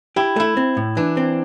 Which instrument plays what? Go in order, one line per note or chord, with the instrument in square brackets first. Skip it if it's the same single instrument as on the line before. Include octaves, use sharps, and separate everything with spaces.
[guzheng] E4 [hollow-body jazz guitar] G4
[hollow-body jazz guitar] A3 [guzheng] E4
[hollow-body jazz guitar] C4
A2
[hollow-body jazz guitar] E3 [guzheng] D4
[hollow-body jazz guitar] C4